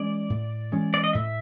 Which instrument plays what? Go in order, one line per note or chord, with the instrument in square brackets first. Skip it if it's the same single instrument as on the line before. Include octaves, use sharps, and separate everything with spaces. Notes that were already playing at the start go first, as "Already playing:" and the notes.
Already playing: [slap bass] E3 G#3 C#4 [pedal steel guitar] D5
[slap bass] A2
E3 G#3 C#4
[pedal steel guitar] D5
D#5
[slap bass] A2 [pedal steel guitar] E5